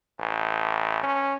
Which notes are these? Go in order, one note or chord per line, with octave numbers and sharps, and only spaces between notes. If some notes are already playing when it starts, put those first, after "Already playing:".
A1
C#4